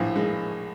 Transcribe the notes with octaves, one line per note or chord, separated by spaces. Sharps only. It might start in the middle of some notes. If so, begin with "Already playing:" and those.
Already playing: A#1 A2
G#3